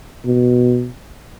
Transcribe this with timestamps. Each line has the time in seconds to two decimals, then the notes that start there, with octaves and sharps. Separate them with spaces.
0.25 B2